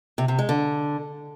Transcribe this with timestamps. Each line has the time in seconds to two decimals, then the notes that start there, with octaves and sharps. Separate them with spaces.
0.18 C3
0.28 C3
0.39 G#3
0.49 D3